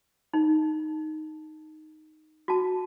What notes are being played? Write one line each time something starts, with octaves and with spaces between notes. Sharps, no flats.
D#4
F#4 A5